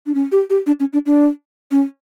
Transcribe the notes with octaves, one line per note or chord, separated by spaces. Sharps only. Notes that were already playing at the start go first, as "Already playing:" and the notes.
D4
C#4
G4
G4
D4
C#4
D4
D4
C#4